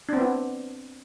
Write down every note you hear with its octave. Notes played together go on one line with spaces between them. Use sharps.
B3 C4 D4 E4